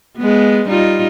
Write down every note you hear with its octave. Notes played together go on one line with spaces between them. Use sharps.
G#3 B3
G3 D#4 F4